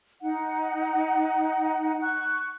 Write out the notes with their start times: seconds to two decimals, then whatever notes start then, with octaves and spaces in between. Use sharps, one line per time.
0.22 D#4 F#5
2.02 C#6 F#6